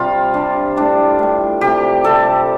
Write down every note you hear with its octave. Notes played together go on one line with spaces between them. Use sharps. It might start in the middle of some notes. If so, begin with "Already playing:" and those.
Already playing: C3 G3 F4
C3 G3 D4
A2 G3 D4
A2 G3
C3 G3 G4
C3 G3 A4